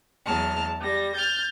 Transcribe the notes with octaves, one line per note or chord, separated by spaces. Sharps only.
E2 F#3 G#3 A5 F6
G3 A#6
F6 G6 A6